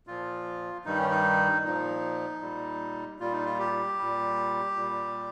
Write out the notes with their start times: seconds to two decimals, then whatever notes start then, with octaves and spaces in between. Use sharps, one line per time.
0.07 A#2 F3 F4
0.85 G2 D#3 G3 D#4
0.99 C#4
1.11 D#4
1.64 A#2 F3 D#4
2.41 A#2 G3
3.20 A#2 G3 F4
3.32 D#4
3.45 F4
3.59 G4
3.98 A#2 G3
4.76 A#2 G3